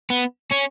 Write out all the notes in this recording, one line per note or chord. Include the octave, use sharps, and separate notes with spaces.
B3
C#4